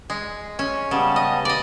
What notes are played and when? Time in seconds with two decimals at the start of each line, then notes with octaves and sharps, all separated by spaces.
0.10 G#3
0.59 C#4
0.91 C#3 G3 B3 A5
1.16 D#5
1.45 D5 D#5